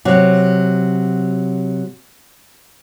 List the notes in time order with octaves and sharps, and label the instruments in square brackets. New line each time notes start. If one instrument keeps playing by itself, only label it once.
[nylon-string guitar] C3 F#3